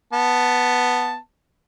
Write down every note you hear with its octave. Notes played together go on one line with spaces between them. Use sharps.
B3 A5